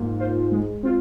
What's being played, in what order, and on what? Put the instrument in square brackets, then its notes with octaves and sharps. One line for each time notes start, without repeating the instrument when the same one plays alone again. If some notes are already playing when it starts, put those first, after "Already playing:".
Already playing: [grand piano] G#2 [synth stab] A#3 F4
[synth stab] F4 C5
G#3
C4 F4